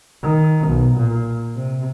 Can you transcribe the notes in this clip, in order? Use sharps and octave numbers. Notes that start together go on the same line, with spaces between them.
D#3
B1
A#2
C3